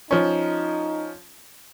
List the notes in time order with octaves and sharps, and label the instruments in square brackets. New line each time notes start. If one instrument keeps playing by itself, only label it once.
[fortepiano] F3 C#4 [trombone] D#4